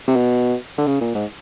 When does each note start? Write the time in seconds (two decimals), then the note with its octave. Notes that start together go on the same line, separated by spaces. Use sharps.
0.08 C3
0.16 B2
0.78 D3
0.87 C#3
1.01 A#2
1.15 G#2